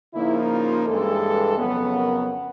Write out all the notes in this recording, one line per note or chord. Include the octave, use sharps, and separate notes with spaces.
C#3 F3 A#3 D#4 E4
F4
G2 E3 G#3 A4
F2 C#3 F#3 B3
A#4